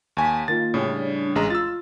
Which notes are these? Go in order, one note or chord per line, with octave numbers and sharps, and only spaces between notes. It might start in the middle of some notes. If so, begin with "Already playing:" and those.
D#2 G#5 C#6 B6
D#3 A#3 F4 A6
A2 C#3 G3 C#4 D4
A1 G#3 A#5
F4 E6 A6